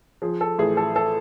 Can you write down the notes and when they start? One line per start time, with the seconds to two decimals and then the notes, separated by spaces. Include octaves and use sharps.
0.22 F3 G#4
0.41 A4
0.58 A1 G#4
0.77 A4
0.96 A4